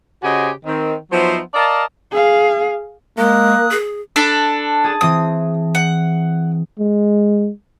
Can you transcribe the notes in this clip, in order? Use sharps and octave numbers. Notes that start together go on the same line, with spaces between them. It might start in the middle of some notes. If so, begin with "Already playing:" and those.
C#3 F#4 G4 C5 D#5 G#5
D#3 C4
F3 F#3 B3 D#4 C5 E5
A#4 D5 D#5 F5 A5
G#4 F5
G#3 A#3 A#4 D#6 F#6
G#4
D4 A4 B5
G#4 A5 D#6
E3 C4 C6 D#6
F#5
G#3